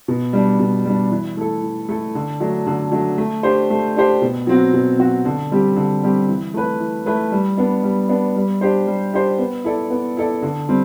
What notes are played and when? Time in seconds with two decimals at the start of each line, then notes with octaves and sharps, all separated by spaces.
0.08 B2
0.33 G3 D4
0.60 B2
0.85 G3 D4
1.11 E3
1.37 A3 E4 A4
1.62 E3
1.89 A3 E4 A4
2.15 D3
2.40 F#3 A3 D4
2.67 D3
2.92 F#3 A3 D4
3.18 A3
3.43 D4 G4 C5
3.70 A3
3.96 D4 G4 C5
4.22 B2
4.47 F#3 C4 F#4
4.73 B2
4.99 F#3 C4 F#4
5.25 D3
5.52 G3 C4 G4
5.76 D3
6.03 G3 C4 G4
6.29 E3
6.54 A3 E4 B4
6.80 E3
7.06 A3 E4 B4
7.32 G3
7.57 B3 D4
7.83 G3
8.09 B3 D4
8.36 G3
8.61 D4 G4 C5
8.87 G3
9.13 D4 G4 C5
9.38 B3
9.64 E4 A4 D5
9.90 B3
10.17 E4 A4 D5
10.42 D3
10.69 G3 C4